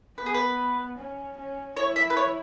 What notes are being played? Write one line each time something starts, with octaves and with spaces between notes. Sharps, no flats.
B3 B4
G#4
B4
C#4
C#4
E4 C#5
E5
B4
C#5